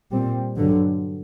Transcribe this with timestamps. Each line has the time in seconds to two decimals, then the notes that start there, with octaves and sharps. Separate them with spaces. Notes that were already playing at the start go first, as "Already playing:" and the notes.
0.11 A#2 G3 C4
0.57 G2 D3 F#3